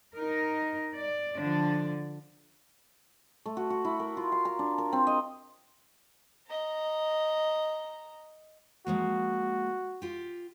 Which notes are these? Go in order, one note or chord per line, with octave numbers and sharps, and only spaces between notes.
D#4 A#4
D5
D3 F3 D4
A3
F#4
F#4
E4
A#4
F4
C6
A#5
D4
A#4
C4
D#5
D#5 A#5
F3 G#3 A#3 F#4
F4 G4